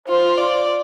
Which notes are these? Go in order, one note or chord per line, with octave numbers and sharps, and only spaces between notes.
F4 C5
D5